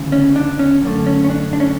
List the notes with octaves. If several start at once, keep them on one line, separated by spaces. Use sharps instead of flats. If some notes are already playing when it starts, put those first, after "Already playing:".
Already playing: D2 C#3 E3
C#4
D4
C#4
F#2 D3 A3
C#4
C#4
D4
D4
C#4